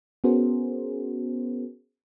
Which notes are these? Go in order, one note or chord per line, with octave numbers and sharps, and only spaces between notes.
B3 C#4 F#4 G#4 A#4 C5